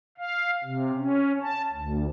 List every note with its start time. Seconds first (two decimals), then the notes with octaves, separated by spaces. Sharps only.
0.18 F5
0.64 C3
0.97 C#4
1.42 A5
1.73 D2